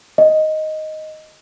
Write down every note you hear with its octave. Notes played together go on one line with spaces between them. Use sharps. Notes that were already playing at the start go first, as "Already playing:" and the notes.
D#5